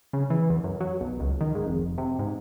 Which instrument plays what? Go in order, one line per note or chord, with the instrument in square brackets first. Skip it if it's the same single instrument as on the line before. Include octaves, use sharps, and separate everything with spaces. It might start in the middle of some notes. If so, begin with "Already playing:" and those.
[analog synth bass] C#3
E3
E2
F#2
F#3
B1
C#2
D#3
G#2
F1
C3
G#2